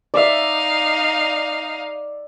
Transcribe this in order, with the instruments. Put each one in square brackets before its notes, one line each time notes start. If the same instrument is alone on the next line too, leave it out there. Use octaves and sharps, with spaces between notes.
[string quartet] D#4 F5 [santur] D5 E5